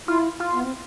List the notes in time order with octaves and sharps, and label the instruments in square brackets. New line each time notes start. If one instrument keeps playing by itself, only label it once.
[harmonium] E4 [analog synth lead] F4
[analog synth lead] F4
[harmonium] B3
C4